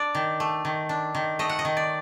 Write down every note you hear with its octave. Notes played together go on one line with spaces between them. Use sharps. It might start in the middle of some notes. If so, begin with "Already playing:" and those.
Already playing: D4 D5
D#3
A3
D#3
D4
D#3
A3 D#5
F#5
D#5
D#3
D5